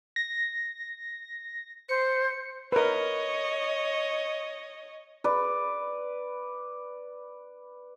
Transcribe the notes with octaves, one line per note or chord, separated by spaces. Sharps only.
A#6
C5 C#7
A#4 B4 C#5 D#5
B4 D5